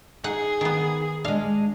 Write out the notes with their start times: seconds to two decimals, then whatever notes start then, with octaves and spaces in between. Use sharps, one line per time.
0.24 D#4 G#4 F#5
0.61 D#3 B3
1.25 G#3 D4 F5